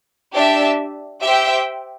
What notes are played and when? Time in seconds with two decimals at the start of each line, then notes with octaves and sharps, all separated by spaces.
0.34 D4 G4 E5
1.21 G4 C5 E5 G5